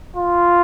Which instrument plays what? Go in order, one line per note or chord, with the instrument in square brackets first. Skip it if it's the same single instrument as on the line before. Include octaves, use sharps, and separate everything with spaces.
[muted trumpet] F4